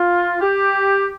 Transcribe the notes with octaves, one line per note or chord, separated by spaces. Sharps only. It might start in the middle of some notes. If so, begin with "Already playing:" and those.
Already playing: F4
G4